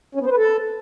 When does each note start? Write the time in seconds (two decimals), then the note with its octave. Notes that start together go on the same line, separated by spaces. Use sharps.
0.15 C#4
0.21 B3
0.26 C5
0.32 B4
0.37 A4